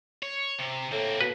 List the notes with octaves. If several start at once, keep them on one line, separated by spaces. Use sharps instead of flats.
C#5
C3
A2 A#3 C4
B2 B4